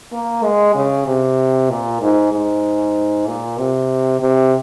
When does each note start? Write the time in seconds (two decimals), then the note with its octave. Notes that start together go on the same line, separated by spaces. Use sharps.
0.12 A#3
0.44 G#3
0.75 C#3
1.07 C3
1.70 A#2
2.01 G#2
2.32 G#2
3.27 A#2
3.58 C3
4.20 C3